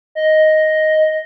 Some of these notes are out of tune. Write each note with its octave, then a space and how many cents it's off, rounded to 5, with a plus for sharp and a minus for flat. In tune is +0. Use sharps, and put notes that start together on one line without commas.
D#5 +5